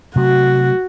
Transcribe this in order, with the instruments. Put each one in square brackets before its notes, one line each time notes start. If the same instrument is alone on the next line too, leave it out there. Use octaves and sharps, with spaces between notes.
[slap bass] C3 F#3 A3 [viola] F#4